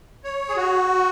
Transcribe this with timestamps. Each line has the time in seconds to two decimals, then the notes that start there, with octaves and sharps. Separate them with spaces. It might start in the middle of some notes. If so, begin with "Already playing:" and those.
0.24 C#5
0.49 G#4
0.57 F#4